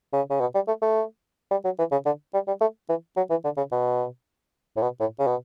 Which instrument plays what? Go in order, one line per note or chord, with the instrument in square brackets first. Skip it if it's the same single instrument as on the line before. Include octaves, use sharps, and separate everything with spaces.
[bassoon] C#3
C#3
B2
G3
A3
A3
G3
F#3
E3
C#3
D3
G3
G3
A3
E3
F#3
E3
D3
C#3
B2
A2
B2
A2
C#3
B2